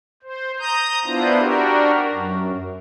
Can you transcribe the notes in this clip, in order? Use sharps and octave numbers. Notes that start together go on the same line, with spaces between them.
C5
A#5 D#6 G6
B3 D4 E4 F4 C5
D4 F#4 G4 A#4
F#2